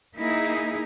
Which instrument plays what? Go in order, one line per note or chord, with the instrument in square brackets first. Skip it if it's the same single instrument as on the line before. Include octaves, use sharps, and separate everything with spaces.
[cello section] A#3 D#4 E4 G#4